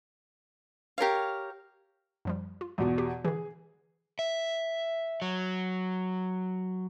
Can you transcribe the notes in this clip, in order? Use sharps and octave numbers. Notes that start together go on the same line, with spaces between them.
G4 A#4 C#5 F5
F#2 F3 G3
F4
E2 B2 G#3 F4
G4
D3 E3 G#4
E5
F#3